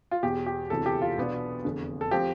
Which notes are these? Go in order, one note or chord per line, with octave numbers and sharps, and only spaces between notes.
F4
E1 E2 B2 G4
G4
E1 D2 C3 E3 A4
G4
F4
B1 B2 B3 D4 F4
F1 E2 D3
A4
F3 C4 F4 G4